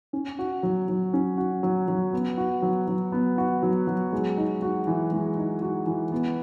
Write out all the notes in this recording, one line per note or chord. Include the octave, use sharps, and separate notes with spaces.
C#4
F#4
F#3
F#3
C#4
F#4
F#3
F#3
B3
F#4
F#3
F#3
B3
F#4
F#3
F#3
G#3
D#4
F#4
E3
G#3
D#4
F#4
E3
B3